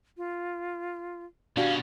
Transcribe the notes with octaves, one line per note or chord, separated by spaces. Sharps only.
F4
B2 C#4 D4 F#4 G4 F5